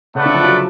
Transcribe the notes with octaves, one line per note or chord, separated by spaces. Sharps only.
C#3 A3 F4 B4 D5 F#5
D3
F3
F#3